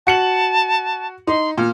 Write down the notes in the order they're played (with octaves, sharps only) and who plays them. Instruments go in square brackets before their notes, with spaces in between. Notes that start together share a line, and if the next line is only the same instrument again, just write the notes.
[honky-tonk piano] F#4 C#7 F#7 [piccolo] A5
[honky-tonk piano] D#4 [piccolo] C6
[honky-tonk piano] A#2 [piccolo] F6